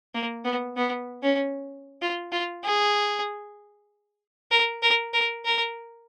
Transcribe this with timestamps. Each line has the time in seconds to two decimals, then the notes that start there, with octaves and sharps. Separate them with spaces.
0.15 A#3
0.45 B3
0.77 B3
1.23 C#4
2.02 F4
2.32 F4
2.64 G#4
4.51 A#4
4.82 A#4
5.13 A#4
5.45 A#4